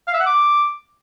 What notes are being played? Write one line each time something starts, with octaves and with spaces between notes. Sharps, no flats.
F5
E5
F#5
D6